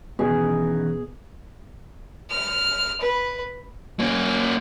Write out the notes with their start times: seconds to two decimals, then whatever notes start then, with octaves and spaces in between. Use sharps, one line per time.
0.19 B2 D#3 E3 B3 C#4 G#4
2.31 F6
3.01 B4
4.00 A#3 C#4